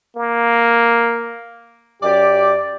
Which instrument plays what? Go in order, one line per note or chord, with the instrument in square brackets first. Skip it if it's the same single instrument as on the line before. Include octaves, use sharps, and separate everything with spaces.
[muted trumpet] A#3
[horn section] F#2 D5 [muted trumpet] G4